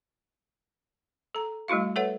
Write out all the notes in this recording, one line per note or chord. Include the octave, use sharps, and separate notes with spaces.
A4 A#5
G3 A3 E4 F#4 F5
A4 B4 C#5 E5 F#5